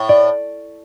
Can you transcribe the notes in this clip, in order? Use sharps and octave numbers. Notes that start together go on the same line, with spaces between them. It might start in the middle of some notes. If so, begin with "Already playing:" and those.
Already playing: A2
D5